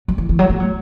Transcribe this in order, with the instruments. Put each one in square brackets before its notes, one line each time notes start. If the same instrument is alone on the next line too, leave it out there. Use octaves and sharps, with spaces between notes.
[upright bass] F#3
E3
E3
F#3
A3
F#3